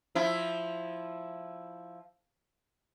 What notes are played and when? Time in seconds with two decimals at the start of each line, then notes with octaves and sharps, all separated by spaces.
0.15 F3 E4